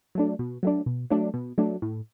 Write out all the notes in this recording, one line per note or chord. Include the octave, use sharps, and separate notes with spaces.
F#3 A3 D4
B2
F#3 A3 D4
B2
F#3 A3 D4
B2
F#3 A3 D4
A2